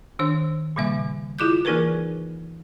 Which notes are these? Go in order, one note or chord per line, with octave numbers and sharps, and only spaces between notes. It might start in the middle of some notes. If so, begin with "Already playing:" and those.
D#3 D4 C5
A#2 C#3 G3 A#3 E5
E4 F4 G#4 D6 F#6 G6
E3 A#3 D#4 G#4 A#4 B4